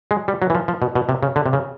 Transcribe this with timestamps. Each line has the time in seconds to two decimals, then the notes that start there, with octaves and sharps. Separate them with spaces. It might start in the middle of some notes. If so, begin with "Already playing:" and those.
0.11 G#3
0.28 G3
0.42 F#3
0.50 E3
0.55 F3
0.68 F3
0.82 B2
0.95 B2
1.09 C3
1.23 C#3
1.36 D3
1.46 C3
1.53 C#3